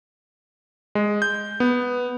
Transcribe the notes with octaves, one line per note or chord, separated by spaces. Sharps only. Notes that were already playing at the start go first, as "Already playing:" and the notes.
G#3
G6
B3